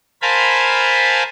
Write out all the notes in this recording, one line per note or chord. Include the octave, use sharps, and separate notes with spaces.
A#4 C5 F5 G#5 A5 B5